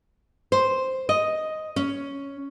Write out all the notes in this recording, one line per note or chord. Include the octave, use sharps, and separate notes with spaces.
C5
D#5
C#4